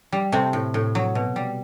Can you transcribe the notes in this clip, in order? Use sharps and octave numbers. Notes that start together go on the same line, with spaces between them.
G3
C3 A3 C4
A2
A2
F#3
B2
G3